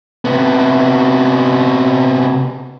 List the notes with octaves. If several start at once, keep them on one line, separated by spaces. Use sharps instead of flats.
C3 B3